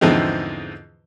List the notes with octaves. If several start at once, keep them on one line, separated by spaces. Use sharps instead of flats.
E2 G#2 D3 F3 G#3 C4